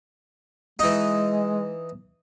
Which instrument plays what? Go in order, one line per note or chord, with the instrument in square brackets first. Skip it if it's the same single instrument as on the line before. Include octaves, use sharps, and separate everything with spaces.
[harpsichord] E3 D#4 [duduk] G#3